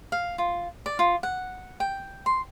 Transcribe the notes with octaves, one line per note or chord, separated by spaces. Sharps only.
F5
F4
D5
F4
F#5
G5
C6